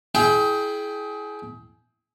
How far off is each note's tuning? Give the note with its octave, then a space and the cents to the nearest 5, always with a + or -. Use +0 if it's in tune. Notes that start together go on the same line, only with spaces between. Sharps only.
E4 +0 G#4 +25 G5 +0